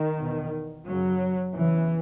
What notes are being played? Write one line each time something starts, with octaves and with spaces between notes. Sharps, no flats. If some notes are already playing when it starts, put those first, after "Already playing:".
Already playing: D#3
E2 B2
F#2 C#3 F#3
E2 C#3 E3